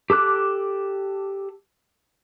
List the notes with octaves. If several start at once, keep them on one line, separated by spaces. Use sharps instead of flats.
G4 A4 D6 F#6